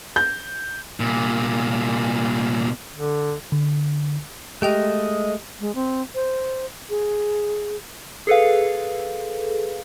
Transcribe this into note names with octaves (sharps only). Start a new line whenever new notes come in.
G6
C2 A#2
D3
D3
G#3 A3 G4 D#5 G5 F7
G#3
C4
C5
G#4
G#4 A4 B4 F5